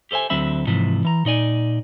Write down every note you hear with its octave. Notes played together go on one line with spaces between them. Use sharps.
G4 A4 C5 E5 G#5
D2 D3 F#3 C4 E5 B5
G#2 C3 E3 F3
E3 A#5
A#2 D#4 D5 G#5